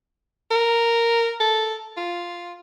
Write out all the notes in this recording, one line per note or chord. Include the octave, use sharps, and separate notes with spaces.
A#4
A4
F4